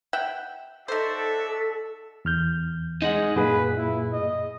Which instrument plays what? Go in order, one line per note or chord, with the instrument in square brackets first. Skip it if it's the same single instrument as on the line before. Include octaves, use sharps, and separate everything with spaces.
[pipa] E5 F#5 G5
[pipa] D#4 C5 [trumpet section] F#4 D5 E5 [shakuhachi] A4
[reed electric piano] E2 F6 G6
[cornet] G#3 [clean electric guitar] D#4 D#5 F#5
[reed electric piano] F#2 G#4 [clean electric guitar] A#2 [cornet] B4
[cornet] E4
D#5